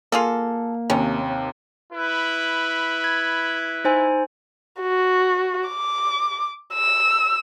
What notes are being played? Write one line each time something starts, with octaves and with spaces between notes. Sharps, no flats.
A#3 F4 G#4 A4
D#2 C3 C#4
E4 B4
G#6
D#4 C5 G#5
F#4
D6
E6